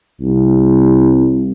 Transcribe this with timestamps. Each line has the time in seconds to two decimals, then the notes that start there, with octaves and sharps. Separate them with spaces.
0.21 C2